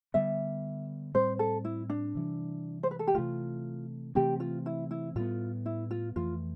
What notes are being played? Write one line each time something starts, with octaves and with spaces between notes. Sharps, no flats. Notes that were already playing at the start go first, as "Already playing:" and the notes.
D3 G3 B3 E5
A2 G3 C4 C5
A4
E4
D4
C3 E3 G3
C5
B4
A4
G4
C3 E3 A3 F4
C3 E3 A3 C4 G4
F4
E4
E4
A2 G3 B3 F4
E4
F4
F2 E3 A3 F4